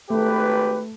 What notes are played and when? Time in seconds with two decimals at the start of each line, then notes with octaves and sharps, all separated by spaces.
0.10 G#1 A3 G4 B4